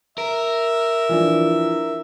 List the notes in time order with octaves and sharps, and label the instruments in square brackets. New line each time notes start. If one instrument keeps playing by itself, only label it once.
[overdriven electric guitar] A#4 [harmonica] E5
[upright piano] E3 F3 D4